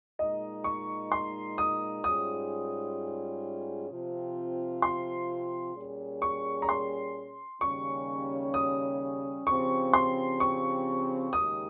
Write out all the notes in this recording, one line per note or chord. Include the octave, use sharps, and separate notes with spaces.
A#2 G#3 D#4 D#5
C#6
C6
D#6
G#2 G3 C#4 F4 G#4 D#6
C3 F3 C4 F4
C6
A#2 G3 C#4 G#4
C#6
A#5
C6
D#2 C#3 G3 C#4 C#6
D#6
C#3 F3 C4 G4 C#6
C6
C#6
D#2 C#3 G#3 D#4 G4 D#6